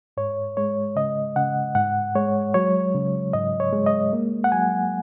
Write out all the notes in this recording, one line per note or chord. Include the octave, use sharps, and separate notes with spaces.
G#2 C#5
G#3 C#5
C#3 D#5
C#3 F#5
G#2 F#5
G#3 C#5
F#3 C#5
C#3
G#2 D#5
C#5
G#3
D#5
A#3
F#5
F#3 G#5